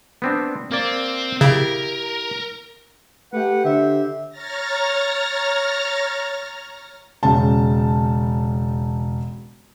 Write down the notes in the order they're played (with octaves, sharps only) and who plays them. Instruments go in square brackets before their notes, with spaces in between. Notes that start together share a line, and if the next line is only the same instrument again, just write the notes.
[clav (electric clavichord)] B3 C4 D4
[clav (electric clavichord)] A#3 D5 [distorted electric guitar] C4
[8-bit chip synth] C#3 [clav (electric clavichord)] E4 G4 [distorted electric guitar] A#4
[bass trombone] A3 [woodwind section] G4 B4 F#5
[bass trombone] D3 [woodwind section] G4 C5 E5
[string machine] C#5 A#5 F6 A6 A#6
[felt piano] E1 C#3 A5